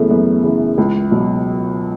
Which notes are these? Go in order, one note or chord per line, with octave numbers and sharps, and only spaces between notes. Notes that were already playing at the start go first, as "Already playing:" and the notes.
Already playing: F#2 C#3 E3 A3 B3
F#2 B3
C#3 E3
C#2
B2 F#3